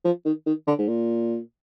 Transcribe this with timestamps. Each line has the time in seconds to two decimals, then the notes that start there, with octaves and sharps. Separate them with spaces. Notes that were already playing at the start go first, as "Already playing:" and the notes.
0.05 F3
0.25 D#3
0.46 D#3
0.67 D3
0.79 G#2
0.88 A#2